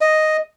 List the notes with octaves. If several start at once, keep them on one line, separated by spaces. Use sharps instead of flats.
D#5